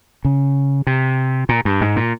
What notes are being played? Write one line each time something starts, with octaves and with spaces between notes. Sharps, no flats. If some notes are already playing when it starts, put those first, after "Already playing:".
C#3
C3
A#2
G2
G#2
A#2